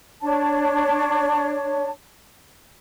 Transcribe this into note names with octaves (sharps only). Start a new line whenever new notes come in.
D4 C#5 A5